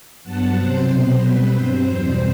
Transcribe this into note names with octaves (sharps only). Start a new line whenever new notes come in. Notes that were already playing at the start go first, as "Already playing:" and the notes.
G2 F#3 B3 F#5 A5
C3 F#3 C4 C5
B2 F#3 B3
B2 G3 C4 B4
G2 F#3 C4 C5
E2 B2 G3 C4